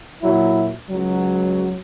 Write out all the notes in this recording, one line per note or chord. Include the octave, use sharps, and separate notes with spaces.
A#2 F#3 E4
C#2 F#3